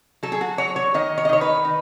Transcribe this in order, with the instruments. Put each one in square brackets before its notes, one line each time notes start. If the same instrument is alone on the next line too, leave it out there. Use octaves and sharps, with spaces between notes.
[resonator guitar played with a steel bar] F#3 A4
G#4
F#4
F#3 C#5
C#5
D#3 D#5
C#5
D#5
D#3 C#5
B4
D#4